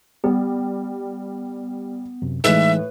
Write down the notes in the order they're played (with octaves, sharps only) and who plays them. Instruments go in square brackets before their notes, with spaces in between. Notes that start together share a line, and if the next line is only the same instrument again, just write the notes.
[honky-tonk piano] G3 [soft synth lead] B3
[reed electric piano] F#2 C3
[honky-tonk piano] A2 [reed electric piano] E3 G#3 D#4 [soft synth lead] B4 [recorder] E5